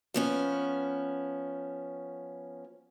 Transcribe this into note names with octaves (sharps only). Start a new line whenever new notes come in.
F3 B3 C#4